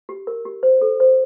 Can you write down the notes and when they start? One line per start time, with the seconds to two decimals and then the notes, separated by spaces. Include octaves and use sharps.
0.09 G4
0.27 A#4
0.45 G4
0.63 C5
0.81 A4
1.00 C5